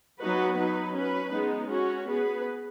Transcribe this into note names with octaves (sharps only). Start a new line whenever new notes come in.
F#3 B3 D#4 F#4 B4
F#3 D#4 B4
C#4 B4
G#3 B3 D#4
C#4 F#4 C#5
B3 G#4 B4